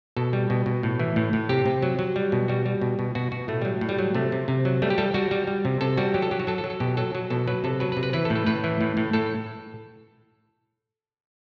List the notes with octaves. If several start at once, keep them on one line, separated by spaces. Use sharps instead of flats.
B2 A4
G3
B2
B2
A2
E3
A2
A2
C3 G4
C3
F#3
F#3
G3
B2
G3 F#4
G3
B2
B2
B2 F#4
B2 F#4
A2 A3
F#3 G3
A2
G3
F#3
C3 A3
C3
C3
F#3
G3 A3
G4
G3 A4
G3 F#4
G3
G3
C3
C3 A4
G3 F#4
F#3 G4
A4
F#3 G4
F#4
F#3 A4
A4
F#3
A4
B2 G4
F#3 A4
F#3
B2 A4
F#3 B4
C3 A4
F#3 B4
B4
C3
B4
E3 B4
A4
A2
A4
A2 B4
E3
A2
A2
A2 A4